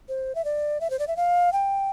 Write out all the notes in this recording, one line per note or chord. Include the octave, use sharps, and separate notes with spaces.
C5
E5
D5
E5
C5
D5
E5
F5
G5